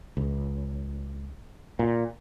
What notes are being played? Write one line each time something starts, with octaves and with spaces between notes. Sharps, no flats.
C#2
A#2